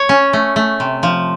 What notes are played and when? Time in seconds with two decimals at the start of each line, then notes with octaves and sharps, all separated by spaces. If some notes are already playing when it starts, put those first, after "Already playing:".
Already playing: C#5
0.09 C#4
0.33 A3
0.56 A3
0.80 C3
1.03 F3